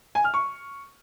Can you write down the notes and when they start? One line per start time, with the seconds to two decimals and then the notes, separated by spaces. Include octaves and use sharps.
0.15 G#5
0.24 F6
0.34 C#6